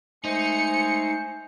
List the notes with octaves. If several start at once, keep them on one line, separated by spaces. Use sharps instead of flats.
G#3 A3 D#4 C5 G#5 C#7